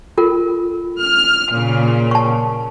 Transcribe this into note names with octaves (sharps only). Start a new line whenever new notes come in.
F4 A4 A#4
F6
A#2 C#3
A5 C#6